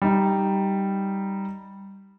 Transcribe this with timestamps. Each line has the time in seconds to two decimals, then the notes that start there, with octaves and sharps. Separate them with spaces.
0.02 G3 D#4